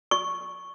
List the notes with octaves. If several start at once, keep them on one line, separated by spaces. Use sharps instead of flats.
C#6